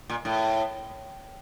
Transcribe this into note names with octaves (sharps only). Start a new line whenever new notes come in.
A#2
A2